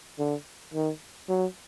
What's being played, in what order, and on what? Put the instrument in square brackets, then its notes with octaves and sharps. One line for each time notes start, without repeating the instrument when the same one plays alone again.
[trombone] D3
D#3
F#3